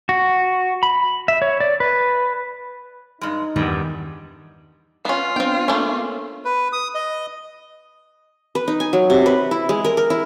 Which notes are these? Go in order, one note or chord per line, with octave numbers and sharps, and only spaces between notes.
F#4
B5
E5
C#5
D5
B4
G2 G#3 D#4
E2 G2 D#3 G3
B3 C#4 F4
B3 C4 D4 G5
A3 A#3 C#4
B4
D#6
D#5
B4
D#4
G#5
F#3
C3
B4
E4
G#3
A#4
A#4
E4